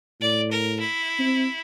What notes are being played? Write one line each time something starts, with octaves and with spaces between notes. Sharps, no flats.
A2 D5
A#4
E4
C4